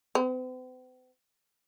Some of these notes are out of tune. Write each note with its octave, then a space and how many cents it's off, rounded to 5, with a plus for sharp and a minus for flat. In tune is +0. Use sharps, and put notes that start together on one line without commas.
C4 -45